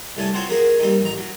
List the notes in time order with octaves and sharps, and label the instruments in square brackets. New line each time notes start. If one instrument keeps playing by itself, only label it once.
[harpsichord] C2 A3 C#4 G#5 A5
C4 F4 F#4 C5 C#5
A#3 C#4 F#4 G#4 A#4
G3 A#3 C4 D#4
A1 A#5
F#3